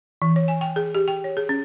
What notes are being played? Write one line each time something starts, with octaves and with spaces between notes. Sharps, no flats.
E3
C#5
G#5
G5
G#4
G4
G5
C#5
G#4
C#4